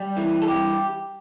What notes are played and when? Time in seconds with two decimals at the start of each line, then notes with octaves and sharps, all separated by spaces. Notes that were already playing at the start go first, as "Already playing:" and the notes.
Already playing: G3
0.17 E3
0.42 A4
0.48 G2 G4